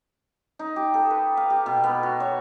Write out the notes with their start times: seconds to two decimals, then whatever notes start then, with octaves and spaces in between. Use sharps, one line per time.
0.59 D#4
0.76 G4
0.94 A4
1.10 B4
1.37 F5
1.50 G4
1.66 B2
1.84 B3
2.03 F#4
2.20 C#5